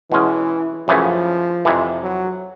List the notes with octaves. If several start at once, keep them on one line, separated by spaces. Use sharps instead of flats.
B2 E3 G#3 C#4
F#2 C#3 E3 F3 A3 C#4
F2 C3 E3
F#3